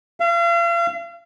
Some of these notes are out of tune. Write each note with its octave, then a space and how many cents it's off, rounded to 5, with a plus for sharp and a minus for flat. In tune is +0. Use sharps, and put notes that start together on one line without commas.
F5 -40